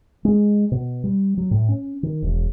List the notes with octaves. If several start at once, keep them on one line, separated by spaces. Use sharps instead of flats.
G#3
B2
G3
F#3
A2
C#4
D#3
E1